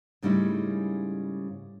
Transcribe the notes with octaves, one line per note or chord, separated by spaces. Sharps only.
G#2 C#3 G3 A3 D#4 E4